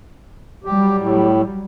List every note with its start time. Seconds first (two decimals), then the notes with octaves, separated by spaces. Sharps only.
0.64 F#3 G3 G4
0.98 A2